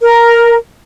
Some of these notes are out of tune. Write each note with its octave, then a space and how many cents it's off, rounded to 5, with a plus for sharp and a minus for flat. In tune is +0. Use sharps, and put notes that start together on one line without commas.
A#4 +5